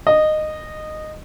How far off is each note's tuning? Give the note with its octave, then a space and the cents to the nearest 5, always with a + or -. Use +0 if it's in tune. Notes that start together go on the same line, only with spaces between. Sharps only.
D#5 -15